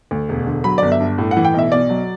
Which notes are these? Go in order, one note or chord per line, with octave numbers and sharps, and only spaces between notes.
D2
E1
D3
F#3 B5
G1 D5
E5
G2
A2
F#5
E3
G5
B1 E5
B2 D5
F#3